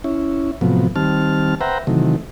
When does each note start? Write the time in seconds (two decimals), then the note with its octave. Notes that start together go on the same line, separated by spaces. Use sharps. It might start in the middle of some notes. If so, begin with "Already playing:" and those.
0.04 C#4 E4
0.61 A2 C3 F3 F#3 B3
0.96 D#3 G3 C4 A5 F6
1.61 B4 C5 E5 F#5 G5 A#5
1.87 C3 D#3 E3 F#3 A3